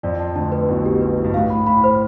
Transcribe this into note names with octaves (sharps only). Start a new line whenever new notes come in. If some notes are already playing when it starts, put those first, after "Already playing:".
F2 F3 D5
A5
D2 D3 A5
B4
B1 B2 E4
G4
B4
E4
G2
A2 F5
B5
A2 B5
C5